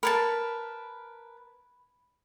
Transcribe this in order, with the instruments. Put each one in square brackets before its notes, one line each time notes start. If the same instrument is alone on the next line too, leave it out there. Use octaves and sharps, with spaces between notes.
[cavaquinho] A#4 B4 A5 [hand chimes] B5 G#6